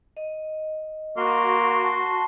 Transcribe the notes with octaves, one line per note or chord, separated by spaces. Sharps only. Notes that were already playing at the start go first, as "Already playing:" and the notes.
D#5
A#3 F#4 C6
A5